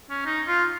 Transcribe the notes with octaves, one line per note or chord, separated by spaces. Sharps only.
C#4
D#4
F4